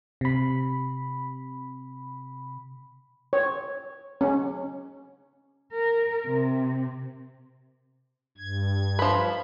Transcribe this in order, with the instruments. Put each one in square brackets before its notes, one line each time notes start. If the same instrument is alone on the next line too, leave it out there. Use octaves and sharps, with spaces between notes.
[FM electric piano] C3 B5
[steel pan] C#5
C#4
[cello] A#4
C3
[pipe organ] G2 G#6
[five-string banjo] F3 B4 [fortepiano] B5